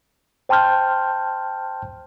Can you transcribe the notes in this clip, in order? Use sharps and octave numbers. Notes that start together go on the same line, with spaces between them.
C5 G5 A5 C6 F6 G6